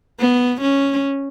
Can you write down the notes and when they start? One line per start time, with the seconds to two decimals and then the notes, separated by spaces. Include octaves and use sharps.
0.19 B3
0.61 C#4